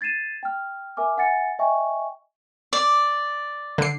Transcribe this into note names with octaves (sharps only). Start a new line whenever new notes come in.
G#6 A6 C7 D#7 E7
G5 F6
A#4 E5 G#5 D6 F6
E5 F#5 G#5 A6 C#7
D#5 E5 G5 G#5 C#6
D5
D3 C7